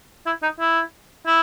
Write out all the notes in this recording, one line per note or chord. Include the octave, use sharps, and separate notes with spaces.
E4
D#4
E4
E4